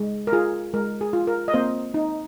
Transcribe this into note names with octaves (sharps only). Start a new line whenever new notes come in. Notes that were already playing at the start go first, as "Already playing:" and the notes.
Already playing: G#3
A#4
F4 G#4
G#3 A#4
G#4
F4
A#4
D#5
A#3 C4 C5
D#4